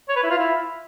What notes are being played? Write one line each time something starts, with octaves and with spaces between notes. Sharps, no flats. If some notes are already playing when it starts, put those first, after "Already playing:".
C#5
B4
E4
F4
E4